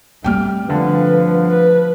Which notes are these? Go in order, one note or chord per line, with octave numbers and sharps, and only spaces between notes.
G3 A3 C4 G5 F6
G1 D3 F3 B4
B4